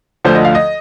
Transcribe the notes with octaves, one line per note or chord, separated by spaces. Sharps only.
D2 D3 F3 C5
D#5
F5
D#5